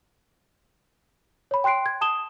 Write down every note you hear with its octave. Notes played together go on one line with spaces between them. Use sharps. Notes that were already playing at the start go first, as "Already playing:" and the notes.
C#5 B5
G5 C6 F#6 C7 D7
G#6
A5 D#6 E7 G7